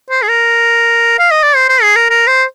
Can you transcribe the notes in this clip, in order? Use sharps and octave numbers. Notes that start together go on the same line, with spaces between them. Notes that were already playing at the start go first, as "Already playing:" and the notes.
C5
G#4
A#4
F5
D#5
D5
C5
C5
G#4
A#4
A#4
C5